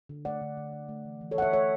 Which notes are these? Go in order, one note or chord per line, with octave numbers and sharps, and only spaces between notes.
D3
A3 D5 F#5
D3
D3
A3
A3
E3
E3
A4 C#5
A3 F#5
C#5 E5
A3 C#5 E5